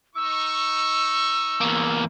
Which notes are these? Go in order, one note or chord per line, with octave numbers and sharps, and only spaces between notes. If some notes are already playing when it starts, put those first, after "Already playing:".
D#4 C#6 E6
E2 A#3